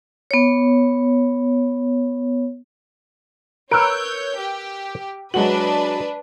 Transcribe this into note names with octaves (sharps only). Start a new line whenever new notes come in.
B3 C#5
A#4 B4 C#5 E6 F#6 G6 D7
G4
F#3 G#3 D4 F#4 B4 F#7